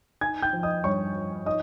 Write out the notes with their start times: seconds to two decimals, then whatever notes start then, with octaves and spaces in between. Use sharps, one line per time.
0.21 D#4 G#5 G#6
0.42 G5 G6
0.53 F3
0.63 D#5 D#6
0.84 G2 C#5 C#6
1.16 F3
1.46 D#4 D#5 D#6